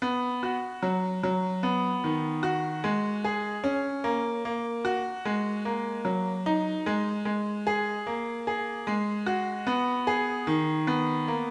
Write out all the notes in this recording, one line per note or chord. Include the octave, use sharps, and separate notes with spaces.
B3
F#4
F#3
F#3
B3
D#3
F#4
G#3
G#4
C#4
A#3
A#3
F#4
G#3
A#3
F#3
D#4
G#3
G#3
G#4
A#3
G#4
G#3
F#4
B3
G#4
D#3
B3
A#3